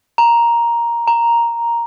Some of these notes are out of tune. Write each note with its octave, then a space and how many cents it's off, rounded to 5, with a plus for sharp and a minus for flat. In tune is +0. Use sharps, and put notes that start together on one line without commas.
A#5 +5
A#5 +0